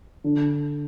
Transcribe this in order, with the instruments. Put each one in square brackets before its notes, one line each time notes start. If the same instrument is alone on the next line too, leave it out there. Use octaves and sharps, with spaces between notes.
[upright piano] D3